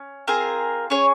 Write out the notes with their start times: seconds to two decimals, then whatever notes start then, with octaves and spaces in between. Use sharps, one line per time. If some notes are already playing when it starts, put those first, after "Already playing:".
Already playing: C#4
0.27 C4 F4 G#4 A#4
0.90 C#4 G#4 C#5